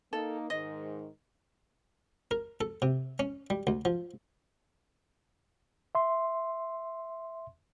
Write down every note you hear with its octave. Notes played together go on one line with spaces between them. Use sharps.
A#3 D#4 A4
G#2 D#3 D#5
A#4
A4
C3
C#4
G3
D2
F3
E5 C6